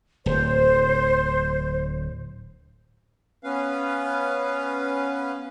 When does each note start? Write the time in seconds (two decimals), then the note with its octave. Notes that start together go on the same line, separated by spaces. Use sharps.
0.26 D1 C5
3.43 B3 C#4 B4 F5